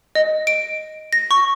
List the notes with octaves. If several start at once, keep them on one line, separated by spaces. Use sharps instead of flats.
D#5
D7
A#6
C#6